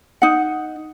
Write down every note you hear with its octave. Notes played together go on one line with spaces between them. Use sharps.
D#4 F#5